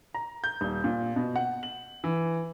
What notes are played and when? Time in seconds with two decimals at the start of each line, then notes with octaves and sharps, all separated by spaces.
0.14 A#5
0.44 G6
0.61 D#1
0.84 A#2
1.16 B2
1.36 F#5
1.63 F#7
2.04 E3